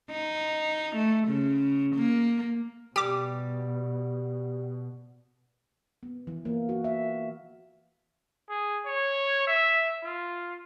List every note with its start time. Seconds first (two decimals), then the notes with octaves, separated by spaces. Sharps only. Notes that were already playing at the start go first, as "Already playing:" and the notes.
0.11 D#4
0.96 A3
1.28 C#3
1.95 A#3
2.96 B2 G3 G4 D6
6.03 B3
6.27 E3
6.45 A#3
6.69 F#4
6.84 E5
8.49 G#4
8.86 C#5
9.47 E5
10.03 F4